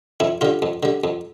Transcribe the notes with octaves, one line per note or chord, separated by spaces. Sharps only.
F2 E4
D3 G3 F4
F2
D3 G3
F2